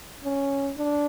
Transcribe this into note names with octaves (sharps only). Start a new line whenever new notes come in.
C#4
D4